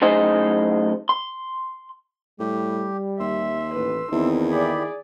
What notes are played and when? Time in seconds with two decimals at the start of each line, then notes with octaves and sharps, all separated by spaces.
0.02 F#2 A2 D#4 G#4 C5 D#5
1.09 C6
2.40 A2 G3 G4
3.20 D#2 E5 C6 E6
3.74 A1 B4
4.12 E2 D#3 A#3 C4 D#4 E4
4.52 G4 G#4 D5 B5